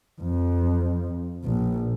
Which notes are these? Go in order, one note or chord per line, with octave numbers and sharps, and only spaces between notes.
F2
A#1